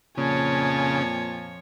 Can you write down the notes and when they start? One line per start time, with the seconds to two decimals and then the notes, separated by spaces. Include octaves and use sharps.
0.18 F2 A#2 C#3 F3 C#5 G#5 A5